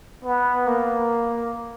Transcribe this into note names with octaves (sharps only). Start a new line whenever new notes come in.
B3
A#3